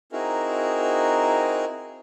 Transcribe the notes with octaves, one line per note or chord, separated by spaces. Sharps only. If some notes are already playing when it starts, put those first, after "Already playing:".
C4 D#4 E4 F#4 G#4 A#4